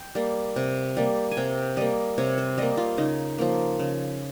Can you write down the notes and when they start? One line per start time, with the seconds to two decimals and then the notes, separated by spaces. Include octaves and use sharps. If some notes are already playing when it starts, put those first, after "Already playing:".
Already playing: G5
0.15 G3 A#3
0.56 C3
0.97 G3 A#3
1.31 G#5
1.37 C3 G5
1.77 G3 A#3 D#5
2.18 C3 C#5
2.38 C5
2.58 G3 A#3 D#5
2.77 F4
2.98 C#3 D#4
3.38 F3 A#3
3.79 C#3